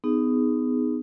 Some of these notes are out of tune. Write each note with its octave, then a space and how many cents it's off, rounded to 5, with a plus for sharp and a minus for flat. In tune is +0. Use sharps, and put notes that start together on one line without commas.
B3 +30 D#4 +0 G#4 +0